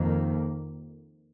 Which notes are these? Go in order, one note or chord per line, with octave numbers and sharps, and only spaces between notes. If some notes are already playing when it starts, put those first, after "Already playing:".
Already playing: F2 D#3 A#3